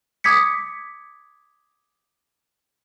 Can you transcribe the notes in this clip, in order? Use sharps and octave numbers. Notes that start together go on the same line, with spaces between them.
D6 D#6 G#6 B6 C#7